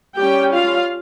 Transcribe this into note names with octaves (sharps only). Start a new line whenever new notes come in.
G3 C#4 G4 G5
F4 F5